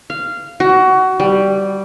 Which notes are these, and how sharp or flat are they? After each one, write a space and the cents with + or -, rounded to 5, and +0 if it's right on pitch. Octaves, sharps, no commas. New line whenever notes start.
F5 -15
F#4 +20
G3 -5